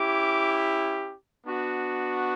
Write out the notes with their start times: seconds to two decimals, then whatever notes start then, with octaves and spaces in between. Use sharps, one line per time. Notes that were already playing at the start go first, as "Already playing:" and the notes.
Already playing: C#4 E4 G4 D6
1.47 B3 D4 F#4